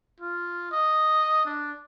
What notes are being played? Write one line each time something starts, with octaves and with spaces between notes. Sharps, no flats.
F4
D#5
D4